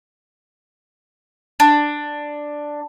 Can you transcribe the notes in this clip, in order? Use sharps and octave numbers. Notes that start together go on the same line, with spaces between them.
D4